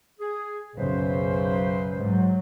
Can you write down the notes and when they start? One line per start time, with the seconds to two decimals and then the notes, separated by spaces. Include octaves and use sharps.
0.20 G#4
0.76 B1 F#2 C#3 B4 C5
1.98 G#2 F#3